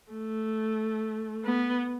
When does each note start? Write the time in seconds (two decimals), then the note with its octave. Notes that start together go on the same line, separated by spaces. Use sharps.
0.12 A3
1.45 B3